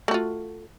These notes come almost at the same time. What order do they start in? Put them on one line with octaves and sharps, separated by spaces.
A3 F#4 F4